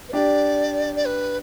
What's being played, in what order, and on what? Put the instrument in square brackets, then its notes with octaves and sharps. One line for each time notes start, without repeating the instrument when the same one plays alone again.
[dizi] B4
[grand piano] D4 G4 [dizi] D5
[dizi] D5
B4